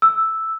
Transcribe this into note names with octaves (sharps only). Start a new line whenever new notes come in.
E6